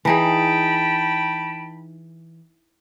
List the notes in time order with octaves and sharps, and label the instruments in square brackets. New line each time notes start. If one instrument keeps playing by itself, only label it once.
[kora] E3 D#4 G#4 [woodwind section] G5 A5 B5